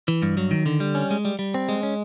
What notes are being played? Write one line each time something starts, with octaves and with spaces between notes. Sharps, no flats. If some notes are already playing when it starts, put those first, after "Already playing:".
E3
G2
F#3
D#3
D3
G3
C#4
G#3
G3
G3
C4
G#3
C#4